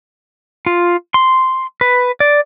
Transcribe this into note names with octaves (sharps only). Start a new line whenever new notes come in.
F4
C6
B4
D5